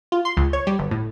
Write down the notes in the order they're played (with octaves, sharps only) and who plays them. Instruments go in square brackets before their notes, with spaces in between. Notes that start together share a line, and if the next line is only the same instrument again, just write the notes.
[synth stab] F4
C6
C#2
C#5
G3
G1
A2